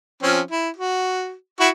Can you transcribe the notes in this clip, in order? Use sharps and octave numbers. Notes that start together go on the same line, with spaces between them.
F3 C4 C#4
E4
F#4
E4 F#4 C#6